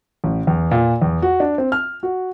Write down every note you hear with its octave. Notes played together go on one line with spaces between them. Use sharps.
A1
E2
A#2
E2
F#4
D4
C4
F6
F#4